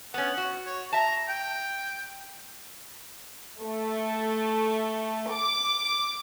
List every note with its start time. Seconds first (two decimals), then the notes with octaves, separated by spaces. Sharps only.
0.14 B3 C#4 F#5
0.38 F#4
0.66 C#5
0.93 E5 A5 A#5
1.29 G5
3.61 A3
5.29 D6